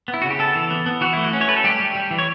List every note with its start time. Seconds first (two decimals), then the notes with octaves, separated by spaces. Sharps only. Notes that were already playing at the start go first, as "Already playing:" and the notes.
0.08 B3
0.14 E4
0.22 C#3 F#4
0.30 G4
0.39 B3 A4
0.55 E3
0.70 B3
0.86 B3
1.01 E3 F#4
1.13 A3 E4
1.24 F#4
1.33 C#4
1.41 C#5
1.48 A3 B4
1.56 A4
1.64 G3 G4
1.80 G3
1.95 G3
2.11 E3
2.19 C#5